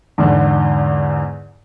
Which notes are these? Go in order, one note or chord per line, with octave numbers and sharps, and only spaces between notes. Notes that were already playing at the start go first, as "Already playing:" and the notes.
E2 G#2 D3